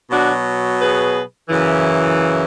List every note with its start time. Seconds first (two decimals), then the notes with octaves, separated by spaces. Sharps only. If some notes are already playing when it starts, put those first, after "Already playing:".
0.11 B2 F#3 D4 F#4
0.79 G#4 B4
1.49 F#2 C#3 E3